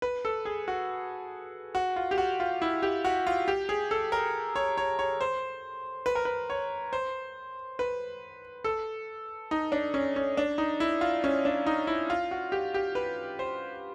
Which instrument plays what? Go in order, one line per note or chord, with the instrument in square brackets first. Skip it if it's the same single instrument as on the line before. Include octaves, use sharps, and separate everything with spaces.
[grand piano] B4
A4
G#4
F#4
F#4
F4
G4
F#4
F4
E4
G4
F#4
F4
G4
G#4
A4
A#4
C#5
C#5
C#5
C5
B4
A#4
B4
C#5
C5
B4
A4
D#4
D4
C#4
C#4
D4
D#4
E4
F4
C#4
D4
D#4
E4
F4
F#4
G4
G4
B4
C5